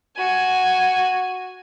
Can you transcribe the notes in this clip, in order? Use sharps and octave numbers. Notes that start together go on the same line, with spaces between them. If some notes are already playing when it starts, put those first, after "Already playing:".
F#4 G#5